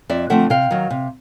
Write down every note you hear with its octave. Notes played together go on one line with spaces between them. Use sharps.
F2 D5 E5
D3 F3 A3 C4 E5 F#5
C3 F5 G5
D#3 F#3
C3